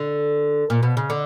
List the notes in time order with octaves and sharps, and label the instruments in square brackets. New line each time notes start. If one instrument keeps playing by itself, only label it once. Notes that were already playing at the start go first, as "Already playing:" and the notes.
Already playing: [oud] D3
A#2
B2
C#3
D3